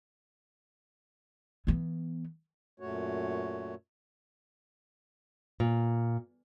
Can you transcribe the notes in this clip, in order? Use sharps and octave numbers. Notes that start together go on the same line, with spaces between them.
E3 B3
F#2 A#2 A3 F#4 C#5
A#2